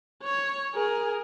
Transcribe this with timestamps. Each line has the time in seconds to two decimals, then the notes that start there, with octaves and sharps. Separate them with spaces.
0.23 C#5
0.75 G#4 A#4